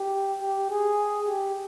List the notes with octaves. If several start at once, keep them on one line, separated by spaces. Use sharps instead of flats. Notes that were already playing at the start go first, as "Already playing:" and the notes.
Already playing: G4
G4
G#4
G4